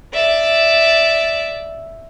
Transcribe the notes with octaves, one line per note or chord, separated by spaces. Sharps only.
D5 E5